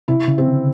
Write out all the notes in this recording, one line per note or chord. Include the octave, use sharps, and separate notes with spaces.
C3 E4
C#3
C4
D3